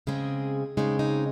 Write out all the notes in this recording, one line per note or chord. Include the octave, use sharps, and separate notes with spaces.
C#3 G#3 C4 G#4
C#3 G#3 C4 D#4
D#4